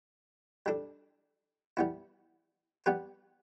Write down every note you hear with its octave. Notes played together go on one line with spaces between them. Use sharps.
G3 D4 A4
G3 B3 E4
G3 B3 G4 B4